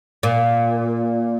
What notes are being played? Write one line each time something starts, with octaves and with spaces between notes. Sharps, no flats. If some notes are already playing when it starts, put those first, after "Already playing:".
A#2